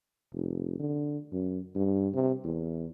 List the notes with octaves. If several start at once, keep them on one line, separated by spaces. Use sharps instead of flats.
F1
D3
F#2
G2
C3
E2